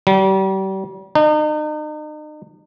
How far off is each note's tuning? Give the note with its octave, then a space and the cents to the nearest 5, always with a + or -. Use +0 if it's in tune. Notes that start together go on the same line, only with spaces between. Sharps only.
G3 -35
D#4 -40